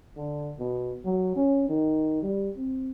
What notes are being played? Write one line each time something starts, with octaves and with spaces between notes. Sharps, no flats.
D3
B2
F#3
C#4
D#3
G3
C4